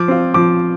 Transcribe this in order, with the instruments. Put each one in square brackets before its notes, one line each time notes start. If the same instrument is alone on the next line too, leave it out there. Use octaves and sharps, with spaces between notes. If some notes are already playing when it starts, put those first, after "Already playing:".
Already playing: [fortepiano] F3 [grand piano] D6
[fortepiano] C4 F4
[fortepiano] F3 [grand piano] D6